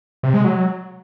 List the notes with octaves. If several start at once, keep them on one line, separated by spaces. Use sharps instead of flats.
C3
G#3
F#3